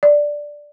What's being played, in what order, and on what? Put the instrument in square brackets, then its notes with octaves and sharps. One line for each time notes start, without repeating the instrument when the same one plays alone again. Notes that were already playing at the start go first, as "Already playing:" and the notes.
[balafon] D5